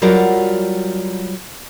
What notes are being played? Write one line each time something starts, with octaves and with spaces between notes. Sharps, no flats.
F#3 G3 F4 F#4 A#4 D5